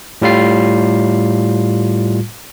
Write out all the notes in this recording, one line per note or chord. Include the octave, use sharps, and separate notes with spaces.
A2 G3 F4 C7